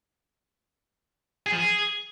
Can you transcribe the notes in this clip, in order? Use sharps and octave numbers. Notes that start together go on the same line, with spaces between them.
G#4
F3
G#4